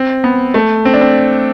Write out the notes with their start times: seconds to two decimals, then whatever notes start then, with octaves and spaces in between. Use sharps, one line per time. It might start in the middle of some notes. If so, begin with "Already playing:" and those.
Already playing: C4
0.24 B3
0.54 A3
0.85 C4
0.93 D4
1.01 C4